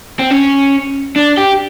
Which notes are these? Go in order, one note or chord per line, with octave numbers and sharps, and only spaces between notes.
C4
C#4
D4
G4